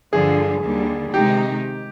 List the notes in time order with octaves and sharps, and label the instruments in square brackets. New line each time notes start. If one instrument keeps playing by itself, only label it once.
[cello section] G2 D3 F3 [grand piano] G#4
[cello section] D#2 D3 G3
[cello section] C3 D#3 G#3 D#4 [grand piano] G4